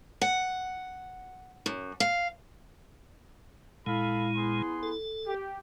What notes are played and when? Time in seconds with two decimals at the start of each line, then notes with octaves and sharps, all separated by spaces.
0.21 F#5
1.66 F#2
2.00 F5
3.86 A#2 G#3 E4 A4 F5 B5
4.36 B3 G#4 C6
4.83 A4
5.26 G4